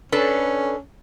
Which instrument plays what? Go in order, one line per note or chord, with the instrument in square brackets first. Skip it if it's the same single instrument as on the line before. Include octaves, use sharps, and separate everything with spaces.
[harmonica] C#4 [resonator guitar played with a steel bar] D4 A4 B4